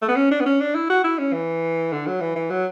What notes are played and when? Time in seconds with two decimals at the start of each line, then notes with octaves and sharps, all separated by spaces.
0.02 A3
0.09 B3
0.16 C#4
0.31 D4
0.40 B3
0.46 C#4
0.61 D4
0.75 E4
0.90 F#4
1.04 E4
1.19 C#4
1.33 E3
1.93 D3
2.07 F#3
2.21 E3
2.36 E3
2.50 F#3